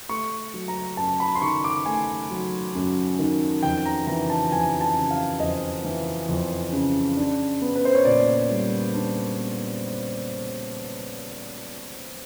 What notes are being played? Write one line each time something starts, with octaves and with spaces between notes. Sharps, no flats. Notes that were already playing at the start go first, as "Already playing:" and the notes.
A3 C#6
F#3
A#5
F#2 A5
B5
C6
D#3 C#6
D6
A3 G#5
F#3
F#2
D#3
F2 G5
A#5
E3 A#5
A5
F2 G#5
A5
C#3
F5
F2 D#5
E3
F2
C#3
D4
B3
B4
C5
C#5
A#2 D5
G3
D4
B3